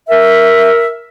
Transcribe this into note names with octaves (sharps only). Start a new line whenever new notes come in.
A#4 E5